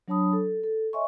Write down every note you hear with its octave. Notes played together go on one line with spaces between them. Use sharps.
F#3 D4 C#5 A5 B5 D#6
A4
A4
C#5 D#5 E5 G#5 C6 C#6